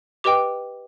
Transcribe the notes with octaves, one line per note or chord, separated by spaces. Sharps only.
G4 B4 D#5 G5 D6